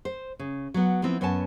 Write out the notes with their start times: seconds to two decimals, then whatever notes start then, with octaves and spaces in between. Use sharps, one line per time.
0.05 C5
0.39 C#3
0.74 F#3 B3
1.03 F3 B3 C4 E4
1.21 F#2 B3 C#5 G#5 A5